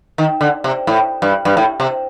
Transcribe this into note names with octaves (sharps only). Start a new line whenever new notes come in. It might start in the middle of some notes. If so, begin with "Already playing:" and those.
D#3
D3
C3
A2
G2
G2
A2
C3